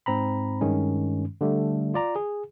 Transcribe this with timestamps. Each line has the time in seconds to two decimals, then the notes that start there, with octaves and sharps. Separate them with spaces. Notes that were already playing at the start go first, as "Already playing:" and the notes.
0.06 G#2 C4 A#5 B5
0.61 G2 D#3 G#3 C#4
1.41 D3 G3 A3
1.94 F4 D5 A#5
2.16 G#4